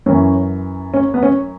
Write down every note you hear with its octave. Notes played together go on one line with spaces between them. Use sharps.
F#2 E3 C#4
C#4
B3
C#4